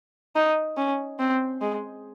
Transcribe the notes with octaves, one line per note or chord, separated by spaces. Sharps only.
D#4
C#4
C4
G#3